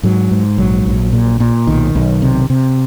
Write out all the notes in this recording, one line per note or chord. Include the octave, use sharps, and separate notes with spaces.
G#2 F#3
G#2
A#1 F#3
A#1
A#2
A#2
B1 D#3
B1
C3
C3